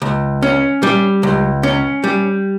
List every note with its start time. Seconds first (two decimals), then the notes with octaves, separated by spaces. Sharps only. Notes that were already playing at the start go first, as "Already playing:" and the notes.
0.02 C#2
0.43 C#4
0.83 G3
1.23 C#2
1.63 C#4
2.04 G3